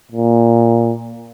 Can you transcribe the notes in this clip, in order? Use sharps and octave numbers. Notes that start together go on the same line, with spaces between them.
A#2